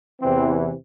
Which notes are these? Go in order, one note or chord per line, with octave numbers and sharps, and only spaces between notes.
E2 C3 E3 C4